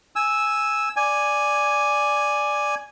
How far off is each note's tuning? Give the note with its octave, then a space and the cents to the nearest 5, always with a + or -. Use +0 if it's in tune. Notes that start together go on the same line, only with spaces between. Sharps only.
G#5 +0 E6 -5
D5 +0 G#5 +0